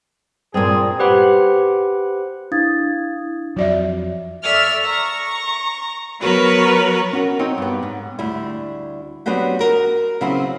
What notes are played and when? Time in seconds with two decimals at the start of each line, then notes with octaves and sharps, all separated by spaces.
0.54 G2 A#2 C4 G#4
0.99 G4 B4 C5 F#5 B5
2.51 D4 E4 F5 D#6 G#6 A6
3.56 F2 F#3 F#4 D5 E5
4.43 A4 D5 E5 C#6 E6 F6
4.83 A#5 C#6
6.20 F#3 B3 F#4 A#4 B4 C#5
7.13 C#4 F#4 A#4
7.39 C4 D#4 C#5
7.58 G2 B3
7.83 G#2
8.19 D2 G3 E4
9.26 F#3 B3 C4 D4 F#4 G4
9.59 F#4 A#4
10.21 C#3 F#3 B3 C4 E4 F#4